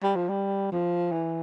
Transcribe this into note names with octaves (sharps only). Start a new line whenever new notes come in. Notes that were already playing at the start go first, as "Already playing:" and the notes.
G3
F3
G3
F3
E3